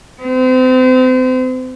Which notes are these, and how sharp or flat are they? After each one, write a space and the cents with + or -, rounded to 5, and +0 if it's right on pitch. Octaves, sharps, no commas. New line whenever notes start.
C4 -35